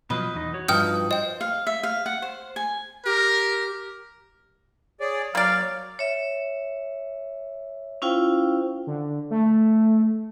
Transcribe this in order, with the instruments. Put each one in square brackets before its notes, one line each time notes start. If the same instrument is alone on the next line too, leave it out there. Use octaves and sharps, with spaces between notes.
[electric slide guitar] B2 F3 F#3 [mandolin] B4 D#5
[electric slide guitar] E2 D#4
F#4 C#5
[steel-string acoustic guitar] G2 F3 [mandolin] D#4 [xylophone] G5 F6 G6
[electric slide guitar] C5 [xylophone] D#5 G5
[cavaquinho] F5
E5
F5
F#5
C5
G#5
[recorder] G4 [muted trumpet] A#4
[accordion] G#4 D5 [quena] C#5
[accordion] F#3 [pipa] A#3 D5 [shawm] F5
[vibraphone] C#5 E5
C#4 E4 F4 C5 F5 G5
[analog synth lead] D3
A3